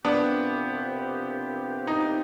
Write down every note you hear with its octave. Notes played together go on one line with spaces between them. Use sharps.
C2 C3 F3 B3 C4 D4 G4
D#4